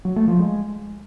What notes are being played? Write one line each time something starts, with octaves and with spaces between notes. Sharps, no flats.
F#3
A3
F3
G#3